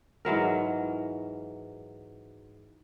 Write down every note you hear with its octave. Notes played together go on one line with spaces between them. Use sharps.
G#2 E3 F#3 A#4